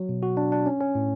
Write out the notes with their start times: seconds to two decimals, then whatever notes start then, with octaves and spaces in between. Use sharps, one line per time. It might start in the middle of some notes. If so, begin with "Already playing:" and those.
Already playing: F#3
0.09 B2
0.23 F#4
0.37 D4
0.52 D4
0.66 C#4
0.81 C#4
0.95 A2